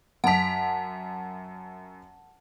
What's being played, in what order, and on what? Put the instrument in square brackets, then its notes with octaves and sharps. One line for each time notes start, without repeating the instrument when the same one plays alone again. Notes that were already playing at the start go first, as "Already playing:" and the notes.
[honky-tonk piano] F#2 B6 [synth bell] F#5 A5